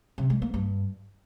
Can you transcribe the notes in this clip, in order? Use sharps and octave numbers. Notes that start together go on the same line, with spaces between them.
C3
G#3
A#3
G2